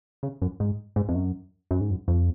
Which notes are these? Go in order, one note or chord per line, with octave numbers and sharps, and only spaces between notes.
C#3
F#2
G#2
G#2
F2
F#2
F#2
G#2
F#2
F2